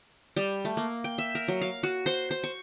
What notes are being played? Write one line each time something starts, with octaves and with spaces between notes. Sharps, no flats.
G3
A3
A#3
G5
E5
A#4
F#3
F5
F#4
C5
C5
C#6